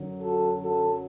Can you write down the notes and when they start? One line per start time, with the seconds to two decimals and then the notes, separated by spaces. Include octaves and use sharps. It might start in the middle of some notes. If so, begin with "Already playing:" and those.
Already playing: F#2 D3 F#3
0.20 F#4 A4
0.61 F#4 A4